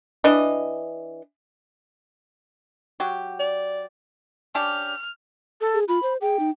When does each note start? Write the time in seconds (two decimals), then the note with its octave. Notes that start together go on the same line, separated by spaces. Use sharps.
0.24 E3 D4 D#5
3.00 F#3 F#4 G4
3.40 D5
4.55 C#4 D4 G4 F6
5.61 A4
5.74 G#4
5.88 F4 B5
6.03 C5
6.21 G#4 G5
6.39 D#4